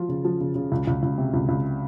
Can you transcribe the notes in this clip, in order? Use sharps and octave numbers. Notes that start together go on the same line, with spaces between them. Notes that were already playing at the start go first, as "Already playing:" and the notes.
Already playing: F3 F4
C#3
F3
C#3
C#3
C#2
C#2
C#2
C3
C#2
C#2